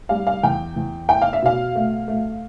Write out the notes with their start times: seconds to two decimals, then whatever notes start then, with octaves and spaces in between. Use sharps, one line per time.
0.09 G3 F5
0.27 F5
0.43 E2 G5
0.76 E2
1.09 E4 G5
1.22 F5
1.33 E5
1.42 B2 F5
1.75 A3
2.08 A3